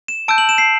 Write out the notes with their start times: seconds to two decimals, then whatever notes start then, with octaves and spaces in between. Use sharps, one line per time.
0.08 E7
0.28 A5 E6 G6 D7
0.38 F#7
0.49 E7
0.58 C7